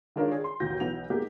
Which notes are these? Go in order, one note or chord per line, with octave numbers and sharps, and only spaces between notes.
D#3 G#3 D4 F4 A#4 C#5
G#4 C#5
C6
A1 D#2 B2 G6 A#6
B1 E3 B3 F7
G#3 A#3 B3 D#4 G4 G#4